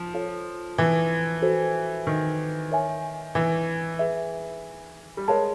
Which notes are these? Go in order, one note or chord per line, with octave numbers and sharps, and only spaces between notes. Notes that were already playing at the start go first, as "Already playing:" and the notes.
Already playing: F3
F4 A4 C#5 F5
E3
F#4 A4 C5
D#3
A#4 C#5 E5 G#5
E3
G#4 B4 E5
G3
G#3 A#4 C#5 F5 A5